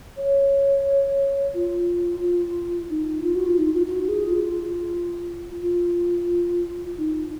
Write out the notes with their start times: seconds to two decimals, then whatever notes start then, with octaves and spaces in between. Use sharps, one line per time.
0.17 C#5
1.54 F4
2.21 F4
2.89 D#4
3.23 F4
3.35 F#4
3.46 F4
3.58 D#4
3.75 F4
3.86 F4
3.91 F#4
4.08 G#4
4.26 F4
5.62 F4
6.98 D#4